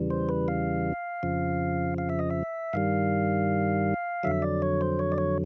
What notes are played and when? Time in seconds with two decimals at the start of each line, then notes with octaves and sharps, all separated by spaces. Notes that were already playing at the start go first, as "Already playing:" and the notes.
Already playing: E2 C#3 E3 G3
0.10 C5
0.29 B4
0.48 F5
1.23 F2 C#3 F3
1.98 F5
2.10 E5
2.19 D#5
2.31 E5
2.73 G2 D#3 G3 F5
4.23 F2 D3 F#3 E5
4.42 D5
4.62 C#5
4.81 C5
4.99 C#5
5.12 D5
5.18 C#5